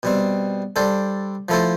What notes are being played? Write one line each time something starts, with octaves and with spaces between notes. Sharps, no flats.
B2 G3 C4
G3 D4 A4 C5
F3 A3 E4 A4 C5